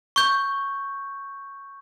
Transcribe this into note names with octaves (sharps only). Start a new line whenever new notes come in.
C#6 G6